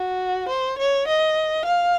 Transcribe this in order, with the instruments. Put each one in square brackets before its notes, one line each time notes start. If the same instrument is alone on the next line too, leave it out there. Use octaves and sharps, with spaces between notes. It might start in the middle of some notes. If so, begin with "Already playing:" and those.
Already playing: [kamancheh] F#4
C5
C#5
D#5
F5